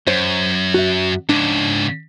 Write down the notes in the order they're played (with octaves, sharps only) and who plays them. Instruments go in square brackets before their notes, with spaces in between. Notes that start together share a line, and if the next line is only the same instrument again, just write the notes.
[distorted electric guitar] F#2 [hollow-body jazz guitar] C5 C#5
[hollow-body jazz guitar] F#4 E5
[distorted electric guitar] G#2 C#3 [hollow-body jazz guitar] D4